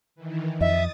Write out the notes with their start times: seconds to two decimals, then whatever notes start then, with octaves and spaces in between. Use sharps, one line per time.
0.15 D#3 E3
0.61 F2 D#5 E5 D#6 A6